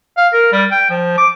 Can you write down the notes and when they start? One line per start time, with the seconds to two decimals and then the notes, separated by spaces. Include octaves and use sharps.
0.17 F5
0.33 A#4
0.52 G3
0.71 G5
0.90 F3
1.18 D6